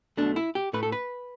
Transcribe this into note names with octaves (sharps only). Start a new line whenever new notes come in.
B1 B2 A3 D4
E4
G4
A2 A3 B4
A4
B4